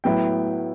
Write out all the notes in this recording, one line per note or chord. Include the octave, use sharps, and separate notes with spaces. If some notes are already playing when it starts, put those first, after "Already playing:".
A2 F#3 B3 E4 G5